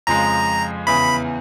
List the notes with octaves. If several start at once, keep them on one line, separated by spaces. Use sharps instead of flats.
F2 C#3 F3 G#3 A#5
E2 C#3 E3 B5